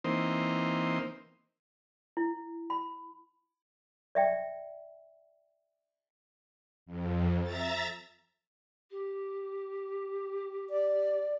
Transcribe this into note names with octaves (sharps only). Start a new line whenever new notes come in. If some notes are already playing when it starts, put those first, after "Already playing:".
E3 A#3 C4 D#4 C5
E4
B5
D5 E5 G5
F2
E5 A#5 A6
G4
D5